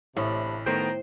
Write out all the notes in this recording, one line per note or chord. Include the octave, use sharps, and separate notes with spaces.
A1 A2 C3 D4 B5
D#3 A3 B3 C5 G5 A#5